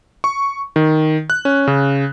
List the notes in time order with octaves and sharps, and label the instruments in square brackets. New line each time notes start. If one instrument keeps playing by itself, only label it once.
[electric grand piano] C#6
D#3
F#6
C#4
C#3